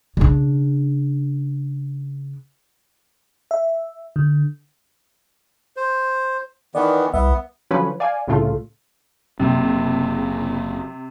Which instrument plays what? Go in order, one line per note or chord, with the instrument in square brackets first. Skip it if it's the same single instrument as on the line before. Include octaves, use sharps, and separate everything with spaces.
[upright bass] C#3 D4
[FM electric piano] E5
D3
[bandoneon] C5
[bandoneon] D#3 E3 B3 [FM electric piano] D5
[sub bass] C2 [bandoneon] B3 [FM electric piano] E5
[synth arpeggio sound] D3 F3 F#3 C#4 B4
D5 F5 G#5
C2 A2 C#3 A3 F4
[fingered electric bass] F#1 F#3 A#3 [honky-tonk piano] C3